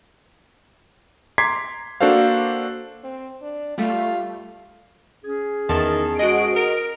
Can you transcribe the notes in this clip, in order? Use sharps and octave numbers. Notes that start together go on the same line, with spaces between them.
A#5 C6 D6 G#6 B6 C7
A#3 D4 F#4 A4 C5 F5
C4
D4
G3 A3 F4
C#4 G#4
E2 D#3 A5
G#3 F#4 D#5 D7
A#4